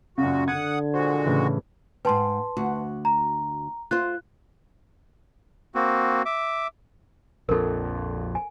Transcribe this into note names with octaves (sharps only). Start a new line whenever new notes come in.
F#2 A#2 C#3 F#4
D3 F#5 D#6 G#6
A#2 G#3 F#4 C5
A2 C#3 E3
G#2 B4 G5 A5 C6
D2 F#4
A#5
F4 C5 F#6
A#3 C4 F#4
E5 D6
A#1 F2 A4 A#4
G#5